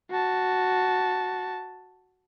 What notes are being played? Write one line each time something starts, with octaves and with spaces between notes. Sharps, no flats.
F#4 A5